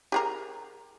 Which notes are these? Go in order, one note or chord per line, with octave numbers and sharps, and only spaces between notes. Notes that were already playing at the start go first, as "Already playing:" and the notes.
G4 G#4 A#4